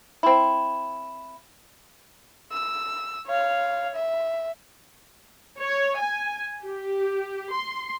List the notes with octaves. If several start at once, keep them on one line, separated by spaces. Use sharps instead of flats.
C4 E4
E6
C#5 F5
E5
C#5
G#5
G4
C6